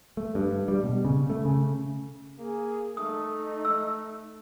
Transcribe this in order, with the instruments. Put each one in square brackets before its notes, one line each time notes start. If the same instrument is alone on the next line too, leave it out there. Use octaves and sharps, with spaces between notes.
[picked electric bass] A3
G2
G3
B2
C#3
A3
C#3
[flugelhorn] A#3 [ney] G#4
[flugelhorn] A3 [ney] D#4 [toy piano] D#6
[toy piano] E6